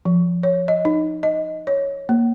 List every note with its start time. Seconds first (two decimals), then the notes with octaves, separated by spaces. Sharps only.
0.05 F3
0.43 C#5
0.68 D#5
0.85 D#4
1.23 D#5
1.67 C#5
2.09 A#3